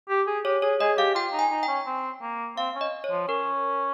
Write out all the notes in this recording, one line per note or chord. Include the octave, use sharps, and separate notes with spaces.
G4
G#4
G4 C#5
G#4 C#5
G#4 D#5
G4 F5
F4 G5
D#4
G#5
D#4
G5
C#4
C4
A#3
C4 F5
C#4
D#5
C#5
F3
C#4 A#4